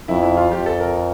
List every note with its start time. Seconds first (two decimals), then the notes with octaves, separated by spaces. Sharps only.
0.08 F2 E4
0.23 E4
0.37 F4
0.51 F2 G4
0.66 A4
0.80 A#4